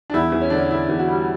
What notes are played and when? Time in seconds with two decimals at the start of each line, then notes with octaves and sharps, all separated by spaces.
0.10 D4
0.14 E2 E4
0.32 E2
0.41 C#4
0.50 D3 D4
0.59 C#4
0.70 D3 E4
0.89 E2
0.99 F#4
1.08 G3